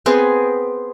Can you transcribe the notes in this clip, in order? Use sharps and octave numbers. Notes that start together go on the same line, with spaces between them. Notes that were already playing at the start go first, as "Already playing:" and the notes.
B3 C4 G#4 B4